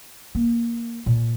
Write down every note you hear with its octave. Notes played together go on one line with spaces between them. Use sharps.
A#3
A#2